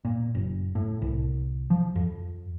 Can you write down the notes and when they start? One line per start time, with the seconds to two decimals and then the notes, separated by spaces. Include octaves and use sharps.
0.05 A#2
0.35 F#1
0.75 A2
1.02 C2
1.70 F3
1.96 F2